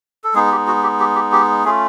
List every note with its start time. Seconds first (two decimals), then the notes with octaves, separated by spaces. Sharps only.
0.24 A4
0.34 G#3 B3 D#4 G#4
0.51 G4
0.67 F#4
0.83 G4
1.00 G4
1.15 G4
1.32 G4
1.64 A3 C#4 F4 G#4